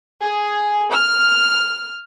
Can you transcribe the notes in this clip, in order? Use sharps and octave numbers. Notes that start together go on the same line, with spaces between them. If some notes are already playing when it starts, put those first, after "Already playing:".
G#4
F6